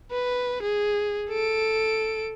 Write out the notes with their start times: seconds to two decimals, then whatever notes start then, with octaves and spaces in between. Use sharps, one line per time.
0.11 B4
0.63 G#4
1.30 A4 D7